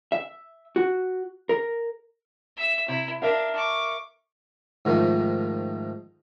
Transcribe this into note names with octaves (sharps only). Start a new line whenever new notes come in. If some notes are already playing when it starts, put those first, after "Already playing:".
E5
F#4
A#4
E5 E6
C3 E4
D4 A#4 E5 F5
C#6 D6
G#2 D#3 F3 A3